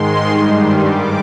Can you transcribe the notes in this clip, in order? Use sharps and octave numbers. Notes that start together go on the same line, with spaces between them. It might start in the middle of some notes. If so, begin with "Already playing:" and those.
Already playing: G#2 D#3 G#3 C6
G2 D#3 G3
G#2 G3 D6